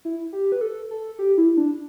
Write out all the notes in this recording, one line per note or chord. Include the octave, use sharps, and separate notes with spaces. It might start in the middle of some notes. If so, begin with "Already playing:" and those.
E4
G4
B4
A4
A4
G4
E4
D4